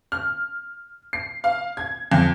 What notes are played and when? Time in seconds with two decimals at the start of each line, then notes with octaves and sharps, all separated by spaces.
0.12 F6
1.13 C7
1.44 F5
1.77 G#6
2.12 F2